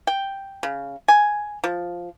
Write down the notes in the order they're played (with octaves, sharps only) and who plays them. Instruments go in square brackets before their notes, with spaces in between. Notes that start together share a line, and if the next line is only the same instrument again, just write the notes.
[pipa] G5
C#3
G#5
F3